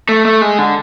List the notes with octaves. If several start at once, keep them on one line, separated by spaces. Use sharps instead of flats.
A3
A3
G#3
D3